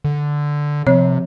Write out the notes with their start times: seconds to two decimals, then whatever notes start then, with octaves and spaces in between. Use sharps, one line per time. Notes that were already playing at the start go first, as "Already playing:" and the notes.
0.05 D3
0.87 C3 F3 C4 C#5